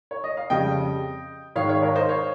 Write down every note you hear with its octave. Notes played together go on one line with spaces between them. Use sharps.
C#5
D#5
F5
F2 C#3 G3 D#5 G5
G#2 D#3 G#3 C#5 F5
C#5 F5
A#4 C#5
C5 D#5
C#5 F5